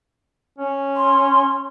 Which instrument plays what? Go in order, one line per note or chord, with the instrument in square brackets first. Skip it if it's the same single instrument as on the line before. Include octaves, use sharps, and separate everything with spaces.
[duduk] C#4
[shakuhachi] C6